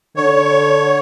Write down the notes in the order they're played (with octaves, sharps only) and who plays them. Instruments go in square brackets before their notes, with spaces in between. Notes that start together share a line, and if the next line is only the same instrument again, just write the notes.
[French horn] D3 [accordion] C#5